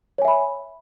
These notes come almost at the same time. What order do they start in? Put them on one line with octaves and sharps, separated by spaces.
C#5 G#5 E5 B5